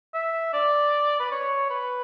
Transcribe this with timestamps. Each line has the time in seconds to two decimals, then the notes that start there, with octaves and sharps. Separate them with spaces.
0.14 E5
0.53 D5
1.20 B4
1.31 C#5
1.70 B4